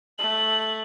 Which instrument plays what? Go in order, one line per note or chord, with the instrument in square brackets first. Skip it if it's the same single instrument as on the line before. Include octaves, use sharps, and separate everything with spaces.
[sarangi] A3 [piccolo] F#7